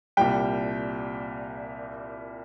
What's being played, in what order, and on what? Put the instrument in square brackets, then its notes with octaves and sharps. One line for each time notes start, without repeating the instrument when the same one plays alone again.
[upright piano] C2 A#2 G3 G5